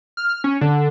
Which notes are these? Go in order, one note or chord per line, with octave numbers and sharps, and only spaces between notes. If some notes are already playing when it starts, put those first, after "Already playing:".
F6
C#4
D3